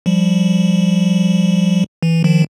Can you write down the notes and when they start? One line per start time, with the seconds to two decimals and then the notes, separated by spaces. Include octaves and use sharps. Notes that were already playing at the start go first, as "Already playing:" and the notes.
0.06 F3 G3
2.03 E3
2.24 D#3 F3